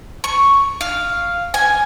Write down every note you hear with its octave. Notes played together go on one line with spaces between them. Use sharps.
C#6
F5
G#5